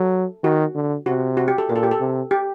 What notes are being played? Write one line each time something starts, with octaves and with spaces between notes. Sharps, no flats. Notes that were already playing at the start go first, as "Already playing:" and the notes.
Already playing: F#3 A4
D#3 F#4
D3
C3 F#4
F#4
G4
A4
A#2 A#4
A4
G4
A4
C3
G4